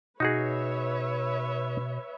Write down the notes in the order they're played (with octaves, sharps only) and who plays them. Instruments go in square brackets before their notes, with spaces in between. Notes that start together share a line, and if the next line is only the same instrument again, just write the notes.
[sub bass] B2 [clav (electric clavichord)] D#4 F#4 G#4 [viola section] B4 C#5 E5